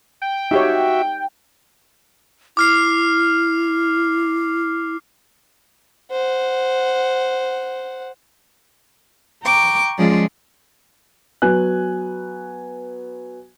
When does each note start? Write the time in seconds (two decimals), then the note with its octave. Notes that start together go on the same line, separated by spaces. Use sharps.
0.22 G5
0.51 D#4 F#4 G4 C#5 E5
2.57 E4 D6 F6 C7
6.11 C5 F#5
9.43 G5 A#5 C#6 D6
9.98 F3 G#3 C#4 F4 G#4 D5
11.42 F#3 B3 G#5 F#6